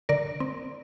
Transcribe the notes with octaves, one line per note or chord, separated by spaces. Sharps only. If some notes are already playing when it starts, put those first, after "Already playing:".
D3 A#4 D5
C4